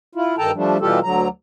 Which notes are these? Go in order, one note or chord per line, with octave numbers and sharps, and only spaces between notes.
E4 F4
G2 D#3 A4 G5 A5 A#5
F3 G3 A3 D4
B2 E3 G3 F4 G4 A4
D2 D3 F#3 A#5